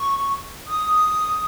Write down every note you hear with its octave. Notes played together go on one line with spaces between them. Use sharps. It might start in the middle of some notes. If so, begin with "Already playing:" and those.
Already playing: C#6
D#6